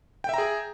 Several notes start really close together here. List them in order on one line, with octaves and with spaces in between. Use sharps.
G5 E5 A#5 G#4